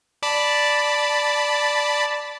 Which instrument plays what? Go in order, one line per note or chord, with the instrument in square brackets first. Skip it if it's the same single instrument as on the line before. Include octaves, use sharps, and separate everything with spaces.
[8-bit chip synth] D5 A5 B5